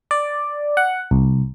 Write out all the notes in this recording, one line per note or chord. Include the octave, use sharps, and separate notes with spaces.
D5
F#5
C2